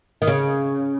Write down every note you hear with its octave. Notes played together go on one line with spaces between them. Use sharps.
D#3
C#3